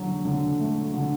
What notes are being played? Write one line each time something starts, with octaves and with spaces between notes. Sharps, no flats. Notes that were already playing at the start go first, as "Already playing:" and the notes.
Already playing: D3 F#3
D3
A3
D3